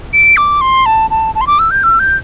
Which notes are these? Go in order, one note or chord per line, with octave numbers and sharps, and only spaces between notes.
D7
D6
C6
A5
A5
A5
C6
D6
E6
G6
E6
G6